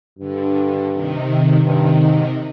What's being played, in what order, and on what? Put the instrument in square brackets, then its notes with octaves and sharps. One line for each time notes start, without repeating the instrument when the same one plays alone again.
[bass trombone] G2 [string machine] D3
[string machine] C3 D#3
[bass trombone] G2 [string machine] C3 D#3
[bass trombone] G#2